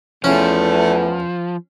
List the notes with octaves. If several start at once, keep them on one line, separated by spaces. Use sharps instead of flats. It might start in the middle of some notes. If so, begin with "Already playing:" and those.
E2 F3 A3 C#4